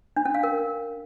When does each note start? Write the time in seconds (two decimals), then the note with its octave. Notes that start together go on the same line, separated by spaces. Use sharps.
0.17 D4
0.25 C#4
0.34 F5
0.43 A#4